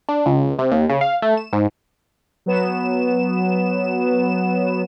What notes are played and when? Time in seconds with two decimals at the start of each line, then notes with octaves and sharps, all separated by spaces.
0.09 D4
0.26 C#2
0.59 C3
0.72 D#2
0.90 C#3
1.01 F5
1.22 A3
1.37 E7
1.53 G#2
2.46 F#3 B3 E7